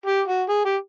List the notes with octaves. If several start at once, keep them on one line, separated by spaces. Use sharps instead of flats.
G4
F#4
G#4
G4